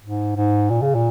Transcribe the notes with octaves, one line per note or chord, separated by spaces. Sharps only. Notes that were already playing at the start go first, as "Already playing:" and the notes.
G#2
G#2
A#2
C#3
A#2